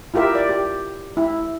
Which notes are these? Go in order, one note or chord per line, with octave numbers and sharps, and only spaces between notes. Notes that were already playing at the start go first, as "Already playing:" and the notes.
E4 F4 G4 A#4 E5
D5
G4
E4